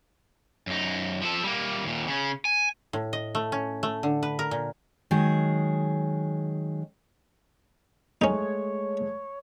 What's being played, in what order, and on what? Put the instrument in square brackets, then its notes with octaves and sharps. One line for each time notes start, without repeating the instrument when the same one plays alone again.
[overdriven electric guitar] F#2 D#4
F3 A4
G3 A#3
D#2 A#2
C#3 C#4
G#5
[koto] A2
D#5
A3
C#4
A3
D3
B4
A#4
A#2
[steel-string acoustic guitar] D#3 F#3 G#3 G#4
[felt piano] G#3 A3 [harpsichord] C#4 D#4 [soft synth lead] C#5